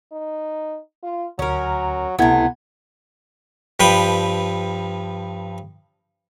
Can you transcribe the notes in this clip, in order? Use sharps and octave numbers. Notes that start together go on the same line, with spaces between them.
D#4
F4
D2 F#3 C#4 A#4
C#2 C3 A3 B3 E4 G#6
G2 F3 B4 G5